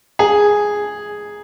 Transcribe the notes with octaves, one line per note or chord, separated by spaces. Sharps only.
G#4